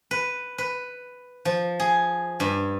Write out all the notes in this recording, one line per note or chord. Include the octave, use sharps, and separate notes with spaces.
B4
B4
F3
G#4
G2